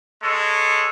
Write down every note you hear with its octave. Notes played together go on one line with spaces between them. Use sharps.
G#3 A4 C#5